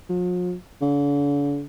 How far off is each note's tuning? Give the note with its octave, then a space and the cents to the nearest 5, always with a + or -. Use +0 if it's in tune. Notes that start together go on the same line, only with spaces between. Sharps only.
F3 +45
D3 -45